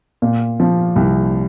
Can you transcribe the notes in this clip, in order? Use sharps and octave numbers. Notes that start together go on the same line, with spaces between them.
A#2
F3
C2